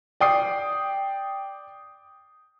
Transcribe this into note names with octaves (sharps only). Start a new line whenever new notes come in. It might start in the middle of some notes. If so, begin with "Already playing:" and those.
D5 G5 D#6 C7